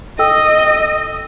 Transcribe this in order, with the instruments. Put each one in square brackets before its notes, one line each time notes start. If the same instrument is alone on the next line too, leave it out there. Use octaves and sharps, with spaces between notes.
[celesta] A4 G5 E6 [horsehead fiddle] D#5